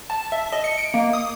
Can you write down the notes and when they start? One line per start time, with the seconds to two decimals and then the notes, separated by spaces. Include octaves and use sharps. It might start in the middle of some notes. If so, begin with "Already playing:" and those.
0.10 A5
0.32 E5
0.53 D#5
0.64 C#7
0.78 D7
0.94 A#3
1.13 D#6